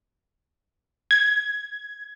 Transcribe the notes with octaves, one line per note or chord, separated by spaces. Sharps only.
G#6